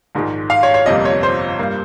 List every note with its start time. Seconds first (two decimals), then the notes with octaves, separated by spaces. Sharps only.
0.15 A#1 G#2 D#3 G#3
0.50 F5
0.63 C#5
0.74 C#5
0.86 G1 F2 C3 G3 A#3 D#5
1.05 C#5
1.23 C5
1.59 G2 G3 A#3